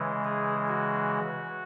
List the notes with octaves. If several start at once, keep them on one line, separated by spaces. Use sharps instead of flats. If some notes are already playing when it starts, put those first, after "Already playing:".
Already playing: C#3 E3 G#3
G#4
F#4